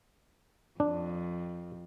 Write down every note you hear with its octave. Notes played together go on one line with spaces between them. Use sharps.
F2 D4